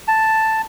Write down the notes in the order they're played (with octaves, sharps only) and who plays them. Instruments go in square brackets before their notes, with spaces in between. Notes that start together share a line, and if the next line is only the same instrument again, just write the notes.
[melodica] A5